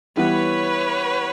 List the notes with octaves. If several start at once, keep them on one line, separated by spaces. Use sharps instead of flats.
E3 G3 B3 B4 C#5